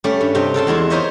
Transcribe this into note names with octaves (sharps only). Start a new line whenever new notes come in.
G3 A3 C#4 D5
G2
G2 C3 D#5 G5
C#3 A4 A5 C6
E2 G#3 E4 F4
D#4 A#4 C5 C#5 D#5 E5